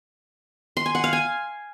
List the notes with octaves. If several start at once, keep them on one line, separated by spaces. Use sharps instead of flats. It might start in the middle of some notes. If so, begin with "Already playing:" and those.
C6
G#5
F#5
F5
G#5